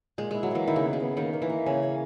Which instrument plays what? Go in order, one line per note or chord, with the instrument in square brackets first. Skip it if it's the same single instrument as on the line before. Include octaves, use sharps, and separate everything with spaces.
[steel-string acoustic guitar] A#2 [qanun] G#3
[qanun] G#3 [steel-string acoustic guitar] E4
[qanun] F#3
[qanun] E3 [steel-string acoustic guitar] A#3
[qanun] D#3 [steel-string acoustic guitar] E4
[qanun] C#3
[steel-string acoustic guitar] B3
[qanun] C#3
[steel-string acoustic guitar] B3
[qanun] D#3 [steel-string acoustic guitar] A#3
[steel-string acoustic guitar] A#3
[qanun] E3
[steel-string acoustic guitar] A#3
[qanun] C#3 [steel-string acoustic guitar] C#4
[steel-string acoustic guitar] A#3